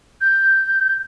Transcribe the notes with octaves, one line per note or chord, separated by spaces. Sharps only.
G6